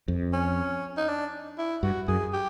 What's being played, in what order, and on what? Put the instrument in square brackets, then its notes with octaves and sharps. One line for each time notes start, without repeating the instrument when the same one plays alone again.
[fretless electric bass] F2
[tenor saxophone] C#4
D#4
D4
E4
[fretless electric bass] G2 [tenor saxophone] F#4
[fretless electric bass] F#2 [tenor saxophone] G#4
[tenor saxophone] G4